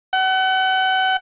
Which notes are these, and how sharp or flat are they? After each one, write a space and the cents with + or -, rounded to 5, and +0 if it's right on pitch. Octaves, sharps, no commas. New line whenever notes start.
F#5 +35